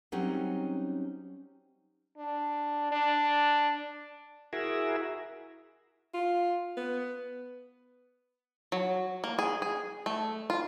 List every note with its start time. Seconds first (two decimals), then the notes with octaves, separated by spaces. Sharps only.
0.12 F#3 G3 C4 C#4 D#4
2.18 D4
2.91 D4
4.53 E4 F#4 G#4 A#4 E5
6.14 F4
6.77 B3
8.72 F#3
9.24 A#3
9.39 G#4
9.62 G#4
10.06 A3
10.50 F4